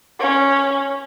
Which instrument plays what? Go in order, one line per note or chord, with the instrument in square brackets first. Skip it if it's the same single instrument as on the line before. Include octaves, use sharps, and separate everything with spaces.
[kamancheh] C#4